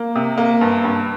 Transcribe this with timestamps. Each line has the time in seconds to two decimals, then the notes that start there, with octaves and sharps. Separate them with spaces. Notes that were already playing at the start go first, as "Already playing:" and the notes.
Already playing: A#3
0.15 C3
0.37 A#3
0.61 G2
0.84 G2